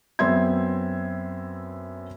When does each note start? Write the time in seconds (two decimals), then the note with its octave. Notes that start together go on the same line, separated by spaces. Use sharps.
0.19 F#2 B3 C4 E5 C6 G#6